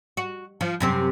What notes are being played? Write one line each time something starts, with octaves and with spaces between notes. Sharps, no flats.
F#4
F3
F#2 C3 C4